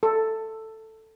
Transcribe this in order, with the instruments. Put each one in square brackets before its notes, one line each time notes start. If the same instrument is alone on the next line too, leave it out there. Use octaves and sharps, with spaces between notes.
[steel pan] A4